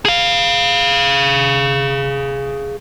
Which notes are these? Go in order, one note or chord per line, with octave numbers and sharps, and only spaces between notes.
G#4 F5